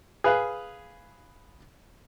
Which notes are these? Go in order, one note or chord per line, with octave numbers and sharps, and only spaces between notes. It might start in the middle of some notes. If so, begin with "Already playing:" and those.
G#4 B4 F5